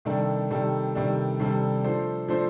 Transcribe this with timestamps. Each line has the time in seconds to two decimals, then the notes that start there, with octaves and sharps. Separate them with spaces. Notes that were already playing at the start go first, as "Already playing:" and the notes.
0.05 C3 D#3 G3 D4 A4
0.50 C3 D#3 G3 D4 A4
0.95 C3 D#3 G3 D4 A4
1.39 C3 D#3 G3 D4 A4
1.84 F3 A3 D4 A4 C5
2.28 F3 A3 D4 A4 C5